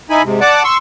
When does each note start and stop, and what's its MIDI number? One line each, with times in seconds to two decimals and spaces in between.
0.10 0.22 63
0.10 0.22 64
0.10 0.22 80
0.10 0.22 83
0.23 0.40 44
0.23 0.40 48
0.41 0.63 74
0.41 0.63 78
0.41 0.63 81
0.41 0.63 86
0.64 0.77 84
0.64 0.77 85
0.64 0.77 88